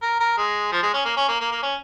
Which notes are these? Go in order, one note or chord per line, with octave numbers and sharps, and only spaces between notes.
A#4
A#4
G#3
F3
G#3
C#4
A#3
C#4
A#3
A#3
A#3
C#4